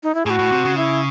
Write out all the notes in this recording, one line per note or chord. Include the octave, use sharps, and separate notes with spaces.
D#4
E4
A2 F#4 G#4
A2
C3
C#3
E4